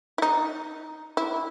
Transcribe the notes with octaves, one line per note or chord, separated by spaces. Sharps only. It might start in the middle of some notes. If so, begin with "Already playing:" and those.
E4
D#4
E4